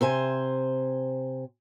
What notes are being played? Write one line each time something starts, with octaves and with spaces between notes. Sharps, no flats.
C3 C5 G#5